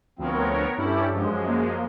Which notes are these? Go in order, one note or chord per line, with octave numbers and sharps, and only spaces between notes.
D2 F3 B3 C4 A#4 C#5
G2 C#4 E4 G4 A4
F#2 F3 G#3
A#3